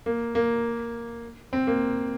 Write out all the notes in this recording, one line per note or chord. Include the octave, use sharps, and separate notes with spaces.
A#3
A#3
C4
A#3